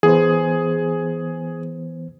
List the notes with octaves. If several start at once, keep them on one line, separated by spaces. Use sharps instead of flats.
E3 B3 G#4 C5